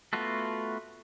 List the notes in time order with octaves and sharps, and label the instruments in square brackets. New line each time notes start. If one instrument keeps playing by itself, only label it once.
[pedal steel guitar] A3 B3 F4 F#4 A4